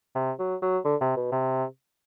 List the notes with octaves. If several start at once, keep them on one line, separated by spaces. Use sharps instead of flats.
C3
F#3
F#3
D3
C3
B2
C3